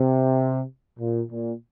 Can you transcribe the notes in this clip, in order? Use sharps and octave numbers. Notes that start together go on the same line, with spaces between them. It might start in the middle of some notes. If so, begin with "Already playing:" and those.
Already playing: C3
A#2
A#2